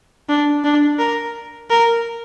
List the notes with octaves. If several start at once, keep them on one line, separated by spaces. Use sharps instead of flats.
D4
D4
A#4
A#4